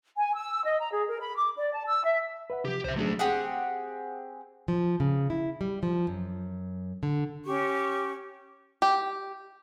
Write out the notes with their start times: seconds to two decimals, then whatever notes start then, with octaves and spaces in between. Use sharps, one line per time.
0.17 G#5
0.35 E6
0.65 D#5
0.79 A#5
0.92 G#4
1.09 A#4
1.21 B5
1.36 D6
1.57 D5
1.74 A5
1.87 E6
2.04 E5
2.50 B4 E5 F#5
2.65 C3 F3 G4
2.85 C2 C5 E5
2.97 F#3 A3 C#4 D4 G#4
3.19 C4 G4 G#4 F#5
4.68 F3
5.00 C#3
5.30 E4
5.61 G3
5.83 F3
6.07 F#2
7.03 D3
7.45 C#4 G4 C#6
8.82 G4